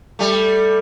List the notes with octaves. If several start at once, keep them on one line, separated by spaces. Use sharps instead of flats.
G3 A3